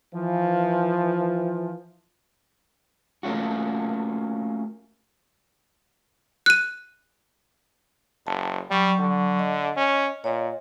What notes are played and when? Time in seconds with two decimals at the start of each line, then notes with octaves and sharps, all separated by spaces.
0.15 E3 F3
3.23 A3 A#3 C#4 F4 F#4
6.46 F#6 D#7
8.27 F#1 A5
8.71 F#3 G3 C#6
9.00 D3
9.39 D#5
9.77 C#4
10.24 A#2 C#5 D#5